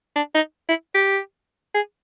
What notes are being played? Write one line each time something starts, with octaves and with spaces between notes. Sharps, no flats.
D4
D#4
E4
G4
G#4